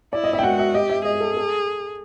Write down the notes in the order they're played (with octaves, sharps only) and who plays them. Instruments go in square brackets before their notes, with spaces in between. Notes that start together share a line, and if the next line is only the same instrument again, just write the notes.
[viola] E4 [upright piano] D5
[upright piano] D#5
E5
G5
[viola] F#4 [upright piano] F#5
[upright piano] E5
[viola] G4 [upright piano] D#5
[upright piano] E5
[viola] G#4 [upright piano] D#5
[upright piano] A4
A4